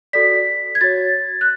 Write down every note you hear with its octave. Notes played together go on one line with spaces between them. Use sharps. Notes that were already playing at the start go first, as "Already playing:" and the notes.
F#4 A4 D5 B6
G#6
F#4 C#5 A6
F#6